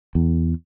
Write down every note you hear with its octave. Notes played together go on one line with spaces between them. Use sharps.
E2